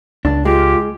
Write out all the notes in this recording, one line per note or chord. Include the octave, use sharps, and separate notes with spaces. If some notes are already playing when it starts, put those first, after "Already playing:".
C#2 D4
G#3 F4 G4